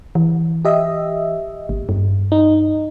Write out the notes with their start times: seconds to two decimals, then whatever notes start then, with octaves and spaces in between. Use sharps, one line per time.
0.15 E3
0.65 G4 D#5 E5
1.69 G#1
1.89 G2
2.32 D#4